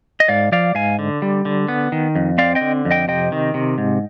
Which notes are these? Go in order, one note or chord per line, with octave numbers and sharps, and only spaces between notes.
D#5
G#2 D5 F5
F3 D5 F5
G#2 F5 G#5
D3
G3
D3
B3
D#3
F2
C4 D5 F5
D#5 G5
D3
F2
D#5 G5
C3 D#5 G5
D#3
C3
G#2